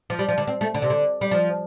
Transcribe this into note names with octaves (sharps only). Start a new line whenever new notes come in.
F3
G3
F3
D3
C4
A3
D3
C3
D3
G3
F3